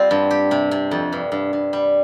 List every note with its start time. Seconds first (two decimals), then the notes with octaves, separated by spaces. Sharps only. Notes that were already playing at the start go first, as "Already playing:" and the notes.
Already playing: G3 C4 F4
0.11 G2
0.31 G4
0.51 C3
0.71 C3
0.91 F2
1.12 G2
1.32 G2
1.53 G2
1.73 G3